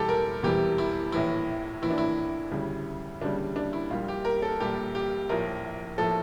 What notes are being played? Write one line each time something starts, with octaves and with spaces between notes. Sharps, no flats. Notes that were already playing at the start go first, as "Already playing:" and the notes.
Already playing: E1 E2 E3 G3 G4 A4
A#4
E1 E2 E3 G3 G4
E4
A#1 A2 E3 E4
A#1 A2 E3 E4
D4
E4
D2 C#3 G3
D2 C#3 G3 D4
D4
E4
A#1 A#2 G3 F4
G4
A#4
A4
A#1 A#2 G3 G4
G4
A#1 A2 F3 A#4
A2 F3 A4